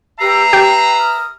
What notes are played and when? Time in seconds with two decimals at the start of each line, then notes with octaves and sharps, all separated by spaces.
0.19 G4 B4 E5 A#5 E6 C7
0.53 G4 G5
0.98 D#6 F6